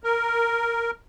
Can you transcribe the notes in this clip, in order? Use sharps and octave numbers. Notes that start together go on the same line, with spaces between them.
A#4